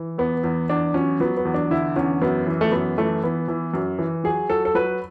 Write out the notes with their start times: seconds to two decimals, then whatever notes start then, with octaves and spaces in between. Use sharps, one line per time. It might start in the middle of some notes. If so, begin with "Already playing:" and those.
Already playing: E3
0.18 E2 B3
0.44 E2
0.69 E2 D4
0.94 F#3 C#4
1.20 F#3 B3
1.37 B3
1.45 E2
1.54 D4
1.70 D3 E4
1.96 E2 C#4
2.22 F#2 B3
2.47 E3
2.61 A3
2.72 F#2 B3
2.98 E3 A3
3.24 E3 B3
3.48 E3
3.74 F#2
3.99 E3
4.24 F#3 G#4
4.50 F#3 A4
4.65 A4
4.75 F#3 B4